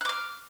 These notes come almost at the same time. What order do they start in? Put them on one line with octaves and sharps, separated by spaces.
F#6 D6 F6